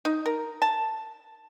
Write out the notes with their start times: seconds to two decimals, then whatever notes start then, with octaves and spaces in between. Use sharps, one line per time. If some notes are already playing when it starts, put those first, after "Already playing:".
0.05 D#4
0.26 A#4
0.62 A5